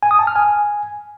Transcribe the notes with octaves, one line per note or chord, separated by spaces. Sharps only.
G#5
D#6
A5
F6
G#5